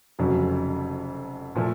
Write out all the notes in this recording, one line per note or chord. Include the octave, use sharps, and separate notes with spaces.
F1 F2 C#3 F#3
A#2 F3 A3